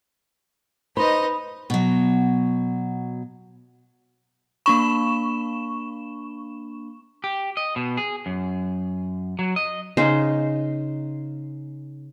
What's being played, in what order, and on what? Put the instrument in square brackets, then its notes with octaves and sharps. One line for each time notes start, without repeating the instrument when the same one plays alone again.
[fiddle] D#4 D#5 [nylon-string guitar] B4 C5 [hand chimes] B5 D#6
[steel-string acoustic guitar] B2 F#3
[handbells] A#3 D4 B5 [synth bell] C#6 E7
[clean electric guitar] G4
D#5
B2
G#4
F#2
F#3
D#5
[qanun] C#3 D#4 C5